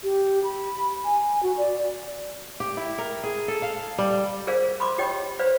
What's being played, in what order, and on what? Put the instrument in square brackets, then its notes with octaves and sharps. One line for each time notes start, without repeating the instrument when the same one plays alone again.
[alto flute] G4
B5
G#5
F#4
D5
[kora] G4
E4
A#4
G#4
A4
F5
G3
[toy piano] G#4 A#4 C5 D5 F5
B5 C6 D6
G4 C#5 D#5 G5
B4 C5 D5 F5